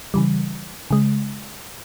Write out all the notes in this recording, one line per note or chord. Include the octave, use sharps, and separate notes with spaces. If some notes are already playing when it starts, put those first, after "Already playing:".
C#3 E3 G3
C#3 G#3